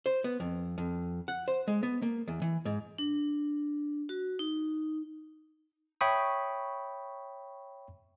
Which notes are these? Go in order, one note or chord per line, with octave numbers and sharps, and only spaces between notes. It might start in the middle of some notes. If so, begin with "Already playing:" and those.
C5
B3
F2
F2
F#5
C5
G#3
B3
A#3
E2
E3
G#2
D4
F#4
D#4
C#5 E5 G5 B5 C#6 D#6